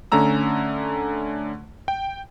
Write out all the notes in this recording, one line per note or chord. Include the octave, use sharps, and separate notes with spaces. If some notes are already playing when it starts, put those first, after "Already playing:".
D3 A3 C#4 A#5 E6
G5